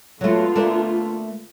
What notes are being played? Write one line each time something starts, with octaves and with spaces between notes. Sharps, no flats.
D3 F#3 A3 B3 F4
A3 A#3 D4